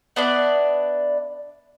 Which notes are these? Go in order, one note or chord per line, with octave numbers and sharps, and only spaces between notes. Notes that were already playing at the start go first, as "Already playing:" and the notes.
B3 D4 E4 D5